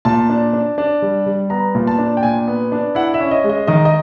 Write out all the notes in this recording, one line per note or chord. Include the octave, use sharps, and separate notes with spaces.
A#2 A5
D4
D4
D4
G3
G3
B3 A#5
A#2
A5
D4
G5
A#2 G#5
B3
D4
E4 F#5
E5
C#4
D#5
G#3
D#5
D#3 D#5
D#5